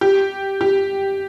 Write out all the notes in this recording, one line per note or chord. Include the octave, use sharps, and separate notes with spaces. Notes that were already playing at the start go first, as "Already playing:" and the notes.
G4
G4